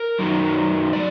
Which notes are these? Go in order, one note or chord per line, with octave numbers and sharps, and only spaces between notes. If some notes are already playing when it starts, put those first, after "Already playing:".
Already playing: A#4
F#2 D#3 F#3
D5